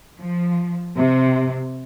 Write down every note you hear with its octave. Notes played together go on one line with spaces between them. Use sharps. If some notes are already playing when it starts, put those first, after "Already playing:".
F3
C3